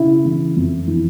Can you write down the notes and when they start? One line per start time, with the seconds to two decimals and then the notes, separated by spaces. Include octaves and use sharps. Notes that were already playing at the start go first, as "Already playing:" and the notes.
Already playing: C#3 E4
0.25 E3
0.56 F2
0.88 E3